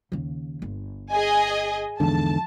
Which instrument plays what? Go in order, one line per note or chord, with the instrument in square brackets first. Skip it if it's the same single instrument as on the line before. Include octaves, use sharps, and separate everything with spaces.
[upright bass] D#2 C#3
G1
[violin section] G#4 D#5 G#5
[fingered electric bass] E2 G#2 D3 [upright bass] F3 [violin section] A5